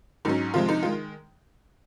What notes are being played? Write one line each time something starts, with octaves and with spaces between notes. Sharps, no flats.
G#2 F#3 C#4 D#4
C3 F3 G#3 F4
D#4
D#3 G#3 F4